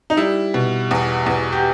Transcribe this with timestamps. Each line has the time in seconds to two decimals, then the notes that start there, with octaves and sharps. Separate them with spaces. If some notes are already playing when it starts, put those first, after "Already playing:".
0.10 D#4
0.17 G3 E4
0.54 B2
0.91 E2
1.26 E2
1.52 G4